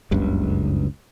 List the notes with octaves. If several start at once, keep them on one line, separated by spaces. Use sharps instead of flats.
F#1 C#2 G2